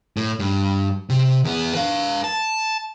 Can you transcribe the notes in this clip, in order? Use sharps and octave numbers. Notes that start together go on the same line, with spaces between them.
A2
G2
C3
E2 B3
B4 F5
A5